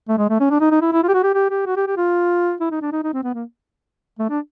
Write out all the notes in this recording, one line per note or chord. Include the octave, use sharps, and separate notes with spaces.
A3
G#3
A3
C#4
D4
D#4
D#4
E4
E4
F4
G4
F#4
G4
G4
G4
F#4
G4
G4
F4
E4
D#4
D4
D#4
D#4
C4
B3
A#3
A3
D4